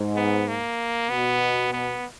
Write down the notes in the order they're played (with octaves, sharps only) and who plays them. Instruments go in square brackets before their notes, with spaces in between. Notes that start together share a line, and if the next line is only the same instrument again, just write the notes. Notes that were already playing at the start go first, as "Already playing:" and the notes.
Already playing: [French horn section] G#2
[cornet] B3
A#3
[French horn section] B2 [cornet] B3
[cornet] B3